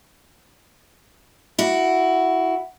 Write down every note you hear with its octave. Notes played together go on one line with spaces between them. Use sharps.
E4 F#4